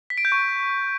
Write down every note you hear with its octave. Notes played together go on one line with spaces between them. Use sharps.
B6
D7
G6
C#6